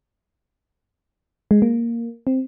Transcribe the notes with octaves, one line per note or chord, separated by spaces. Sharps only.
G#3
A#3
C4